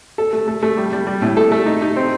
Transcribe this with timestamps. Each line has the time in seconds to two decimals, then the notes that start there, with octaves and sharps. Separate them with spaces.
0.18 A4
0.33 A3
0.47 A3
0.63 A3
0.77 G3
0.92 G3
1.07 G3
1.22 A2
1.37 A4
1.52 A3
1.66 D#4
1.82 D#4
1.96 C4